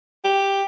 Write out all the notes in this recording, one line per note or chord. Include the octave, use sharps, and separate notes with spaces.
G4